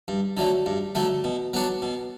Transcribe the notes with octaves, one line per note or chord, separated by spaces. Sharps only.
G2
D3 F#3 A3
G2
D3 F#3 A3
B2
F#3 B3 D4 F#4
B2